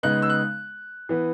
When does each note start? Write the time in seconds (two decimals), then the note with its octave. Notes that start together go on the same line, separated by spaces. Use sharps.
0.03 C#3 G#3 B3 D#4 F#6
0.22 E6
0.30 F#6
1.09 E3 B3